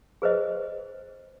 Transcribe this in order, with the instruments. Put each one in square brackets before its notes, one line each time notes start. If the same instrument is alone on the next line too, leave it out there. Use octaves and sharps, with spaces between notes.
[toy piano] G#4 B4 C5 D#5